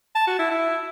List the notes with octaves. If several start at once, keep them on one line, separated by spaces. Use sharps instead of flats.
A5
F#4
E4
E4